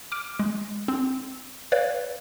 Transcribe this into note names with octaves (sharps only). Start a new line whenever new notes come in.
D6 F6 D7
G#3
C4
B4 C#5 D5 F5 G5